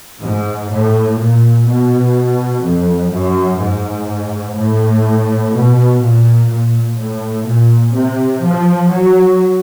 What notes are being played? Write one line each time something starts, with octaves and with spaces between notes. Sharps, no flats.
G#2
A2
A#2
B2
F2
F#2
G#2
A2
B2
A#2
A#2
A2
A#2
C3
F3
F#3